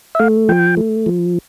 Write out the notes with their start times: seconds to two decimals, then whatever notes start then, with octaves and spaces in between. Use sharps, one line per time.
0.15 E5
0.19 A3 F5
0.49 F3 G5
0.77 A3
1.06 F3